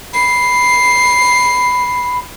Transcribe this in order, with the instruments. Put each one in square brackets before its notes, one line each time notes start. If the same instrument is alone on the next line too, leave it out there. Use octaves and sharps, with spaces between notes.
[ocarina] B5 [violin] C7